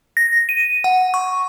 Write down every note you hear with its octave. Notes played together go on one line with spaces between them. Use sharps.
A#6
D#7
F#5
C#6